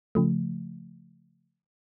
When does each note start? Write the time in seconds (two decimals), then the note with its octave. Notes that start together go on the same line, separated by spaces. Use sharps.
0.15 C#3 F3 A3